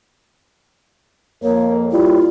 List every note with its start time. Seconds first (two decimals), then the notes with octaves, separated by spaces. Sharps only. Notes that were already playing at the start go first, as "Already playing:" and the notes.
1.43 F2 A#3 A#4 C#5
1.92 G3 E4 F4